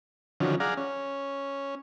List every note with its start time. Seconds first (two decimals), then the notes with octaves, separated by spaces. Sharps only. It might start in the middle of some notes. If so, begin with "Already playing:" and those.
0.40 D3 D#3 F3 F#3 C#4
0.60 G#4 D5 F5 F#5 A#5
0.77 C#4